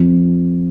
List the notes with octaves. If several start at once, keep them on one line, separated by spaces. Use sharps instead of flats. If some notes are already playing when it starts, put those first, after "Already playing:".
Already playing: F2